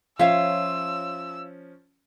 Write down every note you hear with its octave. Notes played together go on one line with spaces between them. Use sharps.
F3 C#4 F4 C#5 E5 F5 E6